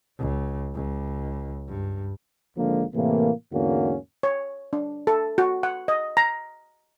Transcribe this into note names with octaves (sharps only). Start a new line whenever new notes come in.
C#2
C#2
G2
G#1 D3 F3 G#3 A#3
A2 C3 E3 A#3
E2 G#2 D3 A#3 C#4 F#4
C#5
D4
A4
F#4
F#5
D#5
A#5